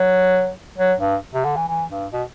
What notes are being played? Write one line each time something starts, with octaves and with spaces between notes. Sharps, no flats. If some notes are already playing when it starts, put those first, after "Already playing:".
Already playing: F#3
F#3
G2
C3
D3
E3
E3
G2
B2